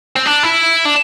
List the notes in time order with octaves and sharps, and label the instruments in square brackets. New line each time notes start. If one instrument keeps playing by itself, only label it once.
[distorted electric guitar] C4
D4
E4
D4